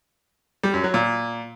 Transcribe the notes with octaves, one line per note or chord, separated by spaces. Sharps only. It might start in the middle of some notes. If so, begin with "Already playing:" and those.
G3
F#2
F#3
A#2